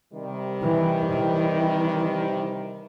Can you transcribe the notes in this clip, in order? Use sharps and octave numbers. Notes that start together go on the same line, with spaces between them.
C3 D#3 G3
E3
E3